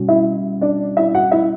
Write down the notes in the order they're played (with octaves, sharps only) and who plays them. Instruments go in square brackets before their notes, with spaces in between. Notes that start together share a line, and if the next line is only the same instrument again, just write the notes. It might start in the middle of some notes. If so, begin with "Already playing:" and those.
Already playing: [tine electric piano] B2 G3 C#4 F#4
[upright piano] E4 E5
D4 D5
E4 E5
F#4 F#5
E4 E5